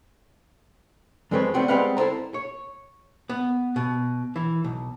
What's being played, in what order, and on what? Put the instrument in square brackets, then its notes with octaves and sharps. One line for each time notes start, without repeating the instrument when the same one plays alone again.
[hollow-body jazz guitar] F2 G#3 C4 A4 B4 C#5
G3 A3 B3 C4 F#4
G3 G#3 C4 B4 F5 F#5
E4 A4 C5 A#5
C#5
B3
B2
E3
B1